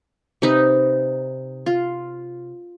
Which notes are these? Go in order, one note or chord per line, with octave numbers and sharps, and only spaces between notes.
C3 D#4 B4
F4